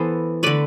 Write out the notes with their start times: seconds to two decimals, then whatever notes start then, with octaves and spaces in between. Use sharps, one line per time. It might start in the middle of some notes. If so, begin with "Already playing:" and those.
Already playing: E3 B3 A4 C5
0.43 D3 A3 B4 D5